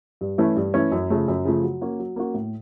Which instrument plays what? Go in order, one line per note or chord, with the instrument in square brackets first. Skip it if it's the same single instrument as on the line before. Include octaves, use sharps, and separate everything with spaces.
[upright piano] G2
E3 A3 C#4 E4
G2
E3 A3 C#4 E4
F#2
C#3 F3 A3
F#2
C#3 F3 A3
F#3
A#3 C#4 F#4
F#3
A#3 C#4 F#4
A2